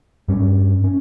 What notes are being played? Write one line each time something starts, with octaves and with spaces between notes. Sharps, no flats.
G2 G3 C#4
C#4